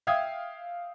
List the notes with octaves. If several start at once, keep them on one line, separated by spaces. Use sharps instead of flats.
E5 F5 G5 D#6 G#6